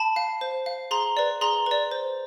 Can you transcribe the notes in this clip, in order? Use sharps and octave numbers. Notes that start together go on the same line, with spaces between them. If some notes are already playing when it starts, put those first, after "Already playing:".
Already playing: A5 B5
F5
C5
F5
G#4 A#5 C6
B4 D5
G#4 A#5 C6
B4 D5
C5